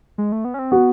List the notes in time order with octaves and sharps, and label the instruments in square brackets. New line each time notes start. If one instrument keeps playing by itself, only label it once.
[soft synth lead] G#3
A3
B3
C#4
C4
[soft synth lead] B3 [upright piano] F#4